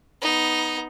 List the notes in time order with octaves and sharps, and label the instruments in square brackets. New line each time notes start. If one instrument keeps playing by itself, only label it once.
[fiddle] B3 D#4